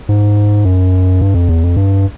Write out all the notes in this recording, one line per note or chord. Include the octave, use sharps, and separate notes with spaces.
G#2
F#2
G2
F2
E2
F2
G2